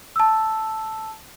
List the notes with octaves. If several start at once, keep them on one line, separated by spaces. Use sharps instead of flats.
A5 E6